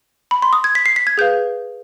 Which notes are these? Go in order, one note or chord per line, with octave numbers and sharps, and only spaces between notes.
B5
C6
D#6
G#6
B6
C7
B6
G#6
G#4 B4 F5 G6